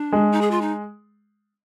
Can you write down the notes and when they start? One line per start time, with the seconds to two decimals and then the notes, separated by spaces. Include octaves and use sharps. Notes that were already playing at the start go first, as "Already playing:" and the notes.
Already playing: D4
0.12 G#3
0.32 D#4
0.41 G#4
0.51 F4
0.61 D#4